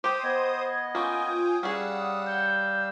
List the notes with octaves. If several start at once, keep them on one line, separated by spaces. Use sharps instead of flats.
G4 C5 G5 D#6
B3 D#5 G#6
A#3 C#4 F4 G5 G#5 D#6
G3 C#4 G#4 F5 F#5 E6
D#6
G6